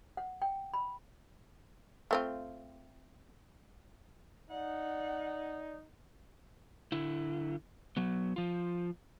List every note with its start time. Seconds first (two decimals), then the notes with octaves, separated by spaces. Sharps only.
0.17 F#5
0.42 G5
0.74 B5
2.11 A3 C4 F4
4.50 D#4 D5 F#5
6.92 D3 E4
7.97 F#3 B3
8.36 F3 F4